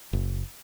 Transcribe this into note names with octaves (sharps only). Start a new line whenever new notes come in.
F#1